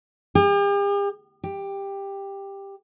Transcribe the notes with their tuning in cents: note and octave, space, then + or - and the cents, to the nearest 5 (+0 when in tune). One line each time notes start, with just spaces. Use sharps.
G4 +45
G4 +10